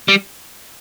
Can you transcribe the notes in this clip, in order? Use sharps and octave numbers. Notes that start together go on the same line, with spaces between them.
G3